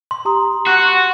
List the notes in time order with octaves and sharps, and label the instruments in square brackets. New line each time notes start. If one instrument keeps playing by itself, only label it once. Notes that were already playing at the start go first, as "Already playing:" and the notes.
[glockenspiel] C6
[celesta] G4 A#5 D#6
[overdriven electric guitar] F#4 [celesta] C#6 F#6